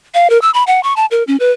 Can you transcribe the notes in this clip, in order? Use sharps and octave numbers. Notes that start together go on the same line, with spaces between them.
F5
A#4
E6
B5
F#5
C#6
A5
A#4
C#4
B4